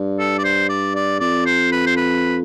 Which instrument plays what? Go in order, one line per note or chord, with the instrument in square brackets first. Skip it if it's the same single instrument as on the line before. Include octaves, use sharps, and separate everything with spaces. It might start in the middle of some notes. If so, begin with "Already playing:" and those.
Already playing: [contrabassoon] G2
[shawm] A4
D5
C5
D5
D5
[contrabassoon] F2 [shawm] D5
[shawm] C5
B4
C5
B4